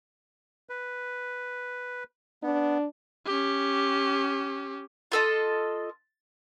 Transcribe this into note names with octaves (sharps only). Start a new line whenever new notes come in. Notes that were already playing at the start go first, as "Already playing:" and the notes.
B4
B3 D4
C#4 G4
F4 A4 D#5